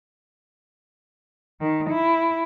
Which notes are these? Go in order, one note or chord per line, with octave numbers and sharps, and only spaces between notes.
D#3
E4